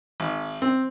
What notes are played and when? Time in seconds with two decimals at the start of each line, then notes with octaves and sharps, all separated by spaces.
0.20 G#1
0.62 C4